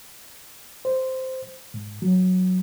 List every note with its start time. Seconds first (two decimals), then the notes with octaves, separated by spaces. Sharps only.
0.85 C5
1.74 G#2
2.02 F#3